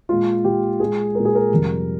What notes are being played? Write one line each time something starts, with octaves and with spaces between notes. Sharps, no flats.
A#2 G#3 F4
A#2 G#3 G4
A#2 G#3 G#4
A#2 G#3 A#4
G#4
A#4
F2 C3 G3